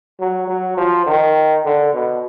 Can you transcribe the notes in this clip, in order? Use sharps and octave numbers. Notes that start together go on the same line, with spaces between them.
F#3
F#3
F3
D#3
D3
B2